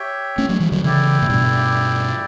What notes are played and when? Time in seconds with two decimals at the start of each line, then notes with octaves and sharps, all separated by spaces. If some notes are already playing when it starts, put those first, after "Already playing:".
Already playing: G4 C#5 E5 G5
0.38 A3 C#4
0.49 F#3 A3
0.60 E3 G3
0.72 D3 F#3
0.84 C#3 E3 E4 G4 D5
1.22 A2
1.29 G2 B2